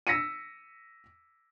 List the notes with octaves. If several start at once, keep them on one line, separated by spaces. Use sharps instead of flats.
E6 A#6 B6 C#7 D#7